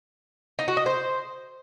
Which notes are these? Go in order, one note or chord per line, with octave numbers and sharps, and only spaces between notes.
D#4
F#4
D#5
C5